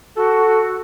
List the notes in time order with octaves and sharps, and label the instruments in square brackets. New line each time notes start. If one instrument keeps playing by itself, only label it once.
[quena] F#4 [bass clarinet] A4